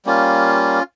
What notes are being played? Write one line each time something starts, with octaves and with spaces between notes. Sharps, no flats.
G3 A#3 C#4 F4